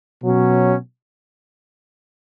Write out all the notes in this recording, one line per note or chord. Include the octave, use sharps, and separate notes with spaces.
B2 F#3 C#4